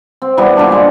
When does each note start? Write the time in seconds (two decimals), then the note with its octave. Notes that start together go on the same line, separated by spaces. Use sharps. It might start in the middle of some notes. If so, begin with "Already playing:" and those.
0.22 C4
0.37 E3 G3 B3 B4
0.57 A#2 D3 D4
0.72 G#3 F#5